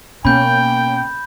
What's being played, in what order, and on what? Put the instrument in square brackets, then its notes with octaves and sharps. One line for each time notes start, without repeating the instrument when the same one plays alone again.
[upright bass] B2 [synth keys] A#3 C#4 [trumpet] G5 [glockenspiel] B5 G6